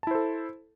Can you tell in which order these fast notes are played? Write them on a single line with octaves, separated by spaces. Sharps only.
A5 E4 C5 A4